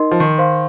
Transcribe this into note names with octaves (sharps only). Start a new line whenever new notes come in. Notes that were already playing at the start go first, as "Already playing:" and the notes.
Already playing: D#4 A#4 D#5 C6
F3
D#3
C5 F5 C6